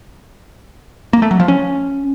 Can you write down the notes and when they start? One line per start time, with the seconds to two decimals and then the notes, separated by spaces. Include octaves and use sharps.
1.13 A#3
1.22 A3
1.31 F#3
1.40 F3
1.48 C#4